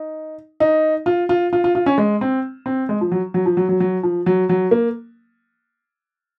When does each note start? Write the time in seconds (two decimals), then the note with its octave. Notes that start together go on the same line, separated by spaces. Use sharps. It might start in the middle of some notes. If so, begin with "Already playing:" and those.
Already playing: D#4
0.60 D#4
1.06 F4
1.29 F4
1.53 F4
1.64 F4
1.75 F4
1.86 C#4
1.98 G#3
2.21 C4
2.66 C4
2.89 G#3
3.01 F3
3.12 F#3
3.34 F#3
3.46 F3
3.57 F#3
3.69 F#3
3.80 F#3
4.03 F3
4.26 F#3
4.49 F#3
4.71 A#3